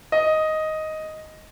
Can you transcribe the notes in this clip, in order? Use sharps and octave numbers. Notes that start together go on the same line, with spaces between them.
D#5